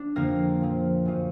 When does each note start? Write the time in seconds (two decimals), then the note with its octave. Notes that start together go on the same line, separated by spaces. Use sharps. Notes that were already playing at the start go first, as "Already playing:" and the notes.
Already playing: D4
0.16 F2 D3 F3 A#3 A#4
0.61 A#2 F3
1.05 F#2 F3